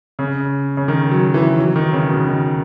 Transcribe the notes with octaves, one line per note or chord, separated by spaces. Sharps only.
C#3
C#3
D#3
F#3
E3
F#3
D#3
C#3
B2
D#3